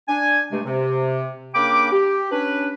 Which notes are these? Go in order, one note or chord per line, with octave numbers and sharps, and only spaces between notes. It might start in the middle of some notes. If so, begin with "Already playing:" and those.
D4 G#5
G2 C3 G#3 A3
C3
C#3 A#3 D4 G5 B5 D6
G4
C#4 D4 B4